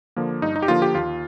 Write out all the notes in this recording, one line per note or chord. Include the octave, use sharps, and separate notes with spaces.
D3 F3 A#3
G2 D#4
D#4
G4
D3 F3 A#3 F4
G4
D#2 F4